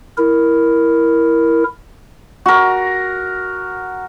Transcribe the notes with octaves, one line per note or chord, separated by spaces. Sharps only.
E4 A#4
F#4 A#4